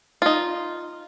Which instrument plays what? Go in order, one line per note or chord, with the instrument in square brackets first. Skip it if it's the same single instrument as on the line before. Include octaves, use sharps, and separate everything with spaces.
[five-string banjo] D#4 F4